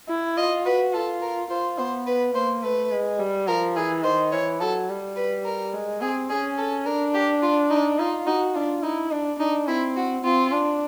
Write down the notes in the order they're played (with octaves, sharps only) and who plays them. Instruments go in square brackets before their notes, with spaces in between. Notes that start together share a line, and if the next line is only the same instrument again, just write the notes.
[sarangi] E4
[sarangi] F4 [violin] D#5
[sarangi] F#4 [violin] B4
[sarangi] F4 [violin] A4
[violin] A#4
[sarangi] F4 [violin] C5
[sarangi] B3 [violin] C5
[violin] B4
[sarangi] A#3 [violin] C5
[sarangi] A3 [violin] B4
[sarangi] G#3
G3
[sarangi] F3 [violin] A#4
[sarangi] E3 [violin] G#4
[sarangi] D#3 [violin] C5
[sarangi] E3 [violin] C#5
[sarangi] F#3 [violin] A4
[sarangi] G3
[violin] B4
A#4
[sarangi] G#3
[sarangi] C4 [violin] G#4
[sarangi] C#4 [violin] G#4
[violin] A4
[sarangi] D4 [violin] A#4
[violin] G4
F4
D#4
[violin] D#4 [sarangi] F4
[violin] D#4 [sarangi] F#4
[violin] D4 [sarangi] F4
[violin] D#4 [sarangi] E4
[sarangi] D4
[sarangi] D4 [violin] D#4
[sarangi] C4 [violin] E4
[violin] F#4
[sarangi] C4 [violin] F4
[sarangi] D4